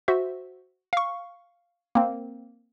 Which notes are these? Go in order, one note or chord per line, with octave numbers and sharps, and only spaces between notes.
F#4 C5 E5
F5 C#6
A#3 C4